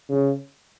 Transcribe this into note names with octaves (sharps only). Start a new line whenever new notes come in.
C#3